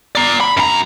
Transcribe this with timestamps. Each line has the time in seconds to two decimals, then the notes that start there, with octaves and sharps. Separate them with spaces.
0.15 D5 A#5
0.40 B5
0.57 F#2 A#5